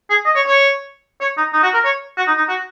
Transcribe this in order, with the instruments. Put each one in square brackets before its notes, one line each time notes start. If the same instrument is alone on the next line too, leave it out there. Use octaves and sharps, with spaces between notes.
[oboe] G#4
D#5
C#5
C#5
C#5
D#4
D#4
F#4
A#4
C#5
F#4
D#4
D#4
F#4